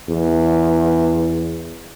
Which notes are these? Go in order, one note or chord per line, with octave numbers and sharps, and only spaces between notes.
E2